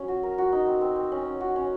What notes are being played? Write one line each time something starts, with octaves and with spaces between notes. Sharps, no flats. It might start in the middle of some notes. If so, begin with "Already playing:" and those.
Already playing: F#3 C#4
F#4
A#4
F#4
D#4
C4
C4
C4
C#4
C#4
F#4
C#4